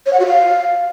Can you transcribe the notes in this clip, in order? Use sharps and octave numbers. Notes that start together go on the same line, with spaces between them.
C#5
F#5
F#4
F5